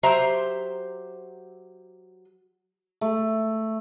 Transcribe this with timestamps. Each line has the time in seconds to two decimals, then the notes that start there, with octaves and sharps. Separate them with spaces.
0.03 F#3 G4 C5 E5 A#5
3.01 A3